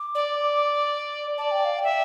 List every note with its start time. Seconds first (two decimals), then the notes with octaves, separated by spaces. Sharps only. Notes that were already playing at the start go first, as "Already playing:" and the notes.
Already playing: D6
0.15 D5
1.38 D5 A5
1.51 G5
1.65 F5
1.78 G5
1.84 E5